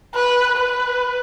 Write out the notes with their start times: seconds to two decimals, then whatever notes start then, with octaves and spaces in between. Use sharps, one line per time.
0.15 B4
0.57 B4